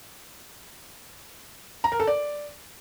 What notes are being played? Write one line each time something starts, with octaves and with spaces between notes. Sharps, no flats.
A#5
A#4
A4
D5